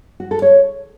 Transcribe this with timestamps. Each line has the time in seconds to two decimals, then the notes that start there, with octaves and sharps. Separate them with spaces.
0.20 F#4
0.31 A4
0.42 C#5